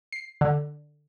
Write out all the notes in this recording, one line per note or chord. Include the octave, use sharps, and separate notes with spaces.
C7
D3